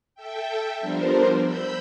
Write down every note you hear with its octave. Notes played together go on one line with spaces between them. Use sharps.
A4 E5 G5
F3 G3 B3 D4 A#4 C5
B5 E6 G6